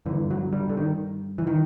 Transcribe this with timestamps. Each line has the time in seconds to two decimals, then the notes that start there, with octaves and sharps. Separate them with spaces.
0.06 G2 D3 E3
0.30 F#3
0.53 G3
0.70 D3
0.77 D#3
1.38 E3
1.47 D#3